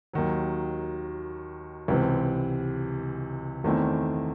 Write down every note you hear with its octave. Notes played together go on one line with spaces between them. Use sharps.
D#2 D#3 F#3
C#2 C3 E3 C4
E2 D#3 A3 C4 E4